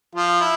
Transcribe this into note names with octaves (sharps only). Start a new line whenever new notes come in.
F3 F4
E4